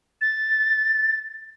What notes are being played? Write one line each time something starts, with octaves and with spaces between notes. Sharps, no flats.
A6